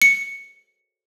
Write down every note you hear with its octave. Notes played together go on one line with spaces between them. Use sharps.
C#7